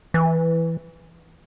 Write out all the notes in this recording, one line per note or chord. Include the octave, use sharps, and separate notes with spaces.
E3